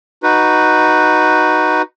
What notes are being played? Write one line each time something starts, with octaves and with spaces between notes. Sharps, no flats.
D#4 F#4 B4